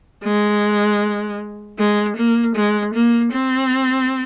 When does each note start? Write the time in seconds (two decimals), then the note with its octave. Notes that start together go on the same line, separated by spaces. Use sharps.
0.24 G#3
1.79 G#3
2.17 A#3
2.56 G#3
2.94 A#3
3.33 C4